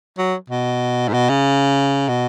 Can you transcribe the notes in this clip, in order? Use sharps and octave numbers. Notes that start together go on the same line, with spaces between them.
F#3
B2
G#2
B2
C#3
B2